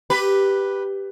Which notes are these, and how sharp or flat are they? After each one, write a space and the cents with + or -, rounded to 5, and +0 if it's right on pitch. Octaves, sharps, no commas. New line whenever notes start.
G4 +0 B4 +0